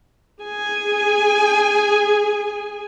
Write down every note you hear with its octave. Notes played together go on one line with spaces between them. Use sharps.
G#4 G#5